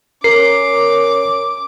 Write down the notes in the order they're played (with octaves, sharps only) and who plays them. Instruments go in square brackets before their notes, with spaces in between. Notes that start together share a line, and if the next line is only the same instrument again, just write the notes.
[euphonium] C#4 [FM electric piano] A#4 [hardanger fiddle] D6 [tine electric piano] C7